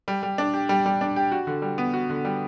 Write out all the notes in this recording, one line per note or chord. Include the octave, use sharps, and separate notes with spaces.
G3
G3
D4
G4
G3
G3
D4
G4
F#4
D3
G3
B3
F#4
D3
G3